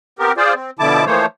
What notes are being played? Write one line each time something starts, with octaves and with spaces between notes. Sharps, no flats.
B3 C4 G4 A#4
F4 G#4 C5 D5
C4
B2 D3 F3 E4 A5 D6
E3 F3 A3 A#3 C5 C#5